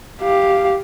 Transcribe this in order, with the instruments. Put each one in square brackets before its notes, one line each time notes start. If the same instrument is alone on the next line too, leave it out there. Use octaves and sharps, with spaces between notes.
[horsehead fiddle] G4 F5